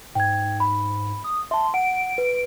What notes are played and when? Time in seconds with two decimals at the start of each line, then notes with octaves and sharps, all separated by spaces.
0.15 G#2 G5 G#6
0.60 B5
1.24 D#6
1.51 E5 A5 C6
1.74 F#5 D7
2.18 B4